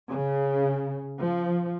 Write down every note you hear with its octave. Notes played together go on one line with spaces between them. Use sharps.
C#3
F3